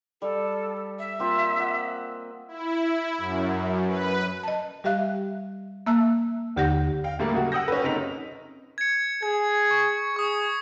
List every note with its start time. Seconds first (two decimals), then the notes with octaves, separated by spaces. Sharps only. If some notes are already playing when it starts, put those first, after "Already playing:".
0.22 G3 A4
0.99 E5
1.19 A#3 C4 F4
1.57 D#5 F#5
2.48 E4
3.17 F#2
3.88 B4
4.43 D#5 A5
4.84 G3 G4 E5 F5 F#6
5.87 A#3 E5 A5 E6 F#6
6.56 D#2 D3 G4 F#5 G6 A#6
7.04 F5 G5
7.19 D2 A2 G3 A#3
7.33 C#3 F#3 F#4
7.52 F#5 G5 D#6 E6 G6 A#6
7.68 C#4 B4
7.83 F#1 C3 D#4 B6 F7
8.78 G#6 C#7
9.23 G#4 G#6
9.71 C#6
10.16 G#4 C#6 D#6